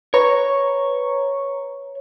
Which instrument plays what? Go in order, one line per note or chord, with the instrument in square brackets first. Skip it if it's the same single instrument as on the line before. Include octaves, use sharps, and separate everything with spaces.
[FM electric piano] B4 A#5 C#6 [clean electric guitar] C#5